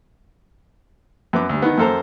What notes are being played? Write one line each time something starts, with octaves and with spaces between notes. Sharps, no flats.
F#2 B3 D6
D2 G3
D#3 B3
F#2 A#3 A4 C5 A#5